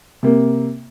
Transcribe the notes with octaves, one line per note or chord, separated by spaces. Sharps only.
C3 A#3